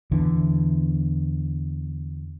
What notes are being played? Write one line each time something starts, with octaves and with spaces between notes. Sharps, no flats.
E2 D3 E3